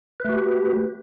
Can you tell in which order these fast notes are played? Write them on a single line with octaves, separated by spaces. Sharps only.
B4 A3 F#4 G4